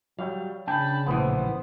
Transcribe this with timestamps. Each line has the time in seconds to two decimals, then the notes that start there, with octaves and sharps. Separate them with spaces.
0.19 F#3 G3 F5
0.68 C#3 D4 G5 A5 B5
1.06 A#1 A2 E3 B3 C5